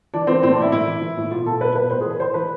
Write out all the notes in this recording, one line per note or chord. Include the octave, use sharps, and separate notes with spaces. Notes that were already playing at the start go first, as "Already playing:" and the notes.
E3 D4
E3 C4
A2 C4
D4
A2 E4
A2 E4
E3
E3
A2
B2 F4
B2 A4
B2 B4
B2 B4
A2 C5
G#4
E3
B4
E3 C5
E3 B4